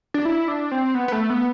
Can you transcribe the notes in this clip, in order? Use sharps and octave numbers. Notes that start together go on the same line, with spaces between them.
D4
E4
D4
C4
B3
B3
A3
B3